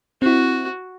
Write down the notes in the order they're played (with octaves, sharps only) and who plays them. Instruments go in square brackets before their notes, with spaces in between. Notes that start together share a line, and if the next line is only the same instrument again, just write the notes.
[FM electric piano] C4 E4 [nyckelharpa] F#4